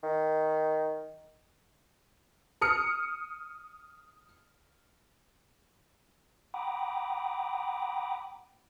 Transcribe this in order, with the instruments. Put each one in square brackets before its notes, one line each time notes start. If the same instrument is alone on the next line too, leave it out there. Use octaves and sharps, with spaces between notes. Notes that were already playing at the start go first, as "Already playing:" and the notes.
[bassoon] D#3
[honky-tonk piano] D#6 F6 C#7
[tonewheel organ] F#5 G5 A#5 B5 D6 D#6